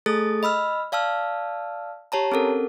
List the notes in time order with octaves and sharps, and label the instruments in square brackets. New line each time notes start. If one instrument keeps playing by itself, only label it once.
[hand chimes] A3 G#4 A4 D#6 A6
D#5 B5 E6 F6
D5 F5 A5 E6 F6
G4 C#5 A5 A#5
C4 C#4 A4 A#4